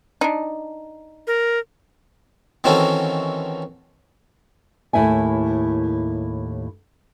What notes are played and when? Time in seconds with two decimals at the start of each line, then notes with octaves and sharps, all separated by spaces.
0.21 D4 D#4
1.27 A#4
2.64 D#3 E3 C4 C#4 F#4 A4
4.93 D#2 A2 E4 E5 G#5